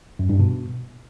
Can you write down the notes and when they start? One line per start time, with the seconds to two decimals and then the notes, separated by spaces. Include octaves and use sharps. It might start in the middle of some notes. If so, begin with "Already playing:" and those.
0.19 F#2
0.29 G2
0.40 B2